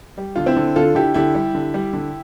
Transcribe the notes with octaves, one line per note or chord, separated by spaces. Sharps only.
G3
D3 F4
C4 E4
D3
D3 F4 A4
D3 E4 G4
D3 E4 G4
G3
D3
G3
D3